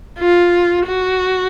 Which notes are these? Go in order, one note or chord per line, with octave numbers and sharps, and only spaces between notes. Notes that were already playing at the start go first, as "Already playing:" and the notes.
F4
F#4